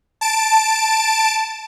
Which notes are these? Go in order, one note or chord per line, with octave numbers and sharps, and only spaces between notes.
A5 D7